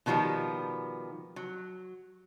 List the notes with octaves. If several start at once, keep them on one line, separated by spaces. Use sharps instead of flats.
B2 D#3 F3 G3 B3
F#3